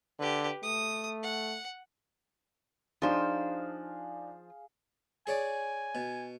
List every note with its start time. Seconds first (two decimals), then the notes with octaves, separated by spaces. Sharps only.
0.19 D3 G4 B4
0.63 A3 D#6
1.23 F#5
3.02 F3 D4 D#4 G#4 C5 F5
5.27 G#4 C#5 D5 G#5
5.95 B2